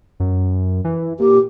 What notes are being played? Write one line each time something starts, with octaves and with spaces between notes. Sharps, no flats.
F#2
E3
A#2 G4